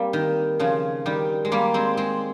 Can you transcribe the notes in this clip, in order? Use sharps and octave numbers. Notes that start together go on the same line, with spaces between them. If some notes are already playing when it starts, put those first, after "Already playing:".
Already playing: G3 A#3 C4
D#3
C#3 F3
D#3 G3
G#3
G3 A#3
G#3 C4
G#3 C4